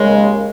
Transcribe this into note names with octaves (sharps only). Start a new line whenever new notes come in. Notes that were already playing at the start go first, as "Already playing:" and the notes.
Already playing: D#2 C#3 G#3